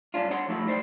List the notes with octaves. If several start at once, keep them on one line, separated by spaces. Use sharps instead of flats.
G2 C#4 D4 F4
D4 C#5 F#5 C6
F3 A3 D#4 E4 G4
A2 G3 C5 G5